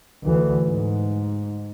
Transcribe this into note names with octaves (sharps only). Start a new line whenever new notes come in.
D2 E3
G#2